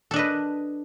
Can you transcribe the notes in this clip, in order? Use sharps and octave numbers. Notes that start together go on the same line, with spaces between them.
D4 A4 B4 D#5